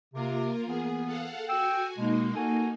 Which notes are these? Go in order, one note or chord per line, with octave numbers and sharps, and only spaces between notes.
C3 A#3 F4 A#4
E3 B3 G#4
A4 F5 F#5
F#4 G5 G#5 E6
B2 G#3 A#3 D#4
F#4 A4 G#5